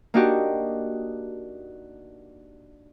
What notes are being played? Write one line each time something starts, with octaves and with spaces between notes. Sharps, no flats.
A#3 D4 D#4 F#4 G4